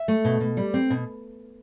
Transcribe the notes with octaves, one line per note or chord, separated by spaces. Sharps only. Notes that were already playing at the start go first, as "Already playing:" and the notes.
Already playing: E5
A3
B2
B2
G3
C4
B2